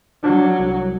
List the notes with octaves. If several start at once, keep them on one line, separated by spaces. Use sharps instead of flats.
F#3 D4
C2